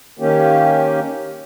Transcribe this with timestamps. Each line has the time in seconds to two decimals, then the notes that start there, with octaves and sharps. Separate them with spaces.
0.19 D#3 A#3 C#4 G4